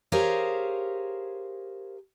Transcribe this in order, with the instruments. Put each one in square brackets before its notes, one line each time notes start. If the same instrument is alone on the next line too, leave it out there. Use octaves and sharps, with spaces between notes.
[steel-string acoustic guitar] G4 G#4 A#4 C5 C#5 F5